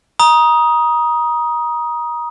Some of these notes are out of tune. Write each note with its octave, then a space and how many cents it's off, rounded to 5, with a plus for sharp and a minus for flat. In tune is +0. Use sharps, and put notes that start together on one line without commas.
A#5 +30 D#6 +5